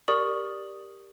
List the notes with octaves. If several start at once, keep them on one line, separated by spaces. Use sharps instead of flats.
G4 A#4 D5 C#6 D#6 F#7